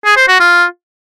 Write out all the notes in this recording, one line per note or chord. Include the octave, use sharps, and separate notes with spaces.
G#4
C5
F#4
F4